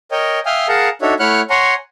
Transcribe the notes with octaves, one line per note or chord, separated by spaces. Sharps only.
A#4 C#5 D#5 G5
E5 F5 G5 G#5 D#6 F6
G#4 A#4 F5 F#5 A5 A#5
D4 D#4 F#4 A4 C#5 E5
A3 E4 C#5 F#5 F6 F#6
C#5 F#5 G#5 A#5 C6 C#6